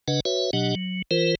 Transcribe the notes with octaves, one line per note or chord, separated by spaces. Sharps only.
C#3 D4 B4 D#5 F#5
F#4 B4 C#5 E5
B2 F#3 D4 G4 D#5 F#5
F#3
E3 F4 A#4 C5